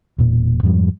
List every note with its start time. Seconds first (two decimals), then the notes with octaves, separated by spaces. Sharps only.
0.18 E1 A#2
0.63 F2 G#2 F3 G3